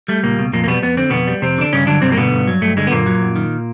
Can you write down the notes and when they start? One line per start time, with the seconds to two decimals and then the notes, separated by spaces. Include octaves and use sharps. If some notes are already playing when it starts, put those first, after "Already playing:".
0.08 G3 A3
0.23 C#2 A#2 A#3
0.39 B2
0.53 F2 A#2 A#3
0.64 A#3
0.68 B2 G3 B3
0.83 F2 B3
0.97 D3 C4
1.10 F2 B2 B3
1.27 G3
1.42 F2 C3 C4
1.58 D3 D4
1.73 G2 C#3 C#4
1.87 D3 F#3 D4
2.02 G2 C3 C4
2.12 A#3
2.17 B2 D3 B3
2.32 G2
2.48 F#3
2.61 G2 A3
2.77 D3 G#3
2.87 B3
2.91 F#2 A#2 A#3
3.07 F#3
3.22 F#2
3.36 D#3